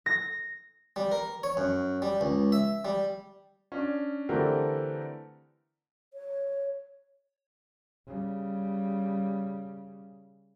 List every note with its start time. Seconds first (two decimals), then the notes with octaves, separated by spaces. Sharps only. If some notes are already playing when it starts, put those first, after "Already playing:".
0.06 A#6
0.96 G3
1.12 A#4
1.43 C#5
1.57 F#2
2.02 G3
2.21 C#2
2.52 E5
2.85 G3
3.72 C#4 D4
4.29 D3 E3 A3 C4 G4 A#4
6.14 C#5
8.07 C#3 G3